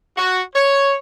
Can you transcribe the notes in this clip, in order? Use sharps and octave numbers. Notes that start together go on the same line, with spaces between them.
F#4
C#5